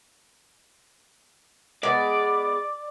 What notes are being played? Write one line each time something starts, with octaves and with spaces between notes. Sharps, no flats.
G#3 B3 D5